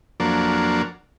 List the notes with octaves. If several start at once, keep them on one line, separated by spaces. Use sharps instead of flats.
F2 F#3 A#3 D4